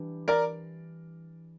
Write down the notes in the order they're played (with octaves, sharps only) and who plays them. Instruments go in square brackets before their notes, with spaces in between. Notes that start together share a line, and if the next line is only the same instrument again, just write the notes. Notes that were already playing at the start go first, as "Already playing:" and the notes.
Already playing: [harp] E3 G3 D4 G4
[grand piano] A#4 D5